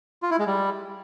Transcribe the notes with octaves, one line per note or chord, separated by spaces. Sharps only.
F4
E4
G#3
G3